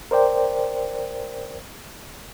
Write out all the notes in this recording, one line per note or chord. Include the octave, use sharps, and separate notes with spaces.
A#4 C5 D5 G5